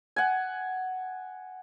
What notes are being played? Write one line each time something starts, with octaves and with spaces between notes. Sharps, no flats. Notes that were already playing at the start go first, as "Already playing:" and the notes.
F#5 G#5